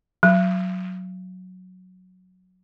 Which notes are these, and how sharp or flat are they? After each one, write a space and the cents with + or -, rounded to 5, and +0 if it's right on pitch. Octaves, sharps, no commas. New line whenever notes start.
F#3 -5